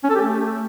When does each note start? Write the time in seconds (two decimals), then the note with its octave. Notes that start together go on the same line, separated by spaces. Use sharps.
0.04 C#4
0.10 A4
0.15 G4
0.21 A3